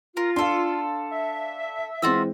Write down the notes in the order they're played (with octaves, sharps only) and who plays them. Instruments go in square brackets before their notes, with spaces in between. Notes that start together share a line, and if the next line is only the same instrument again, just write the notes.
[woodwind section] F4 [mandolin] A#4
[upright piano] D4 F5 [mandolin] A4 C6
[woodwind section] E5
[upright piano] E3 G#3 C4 [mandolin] F4 F#4 E6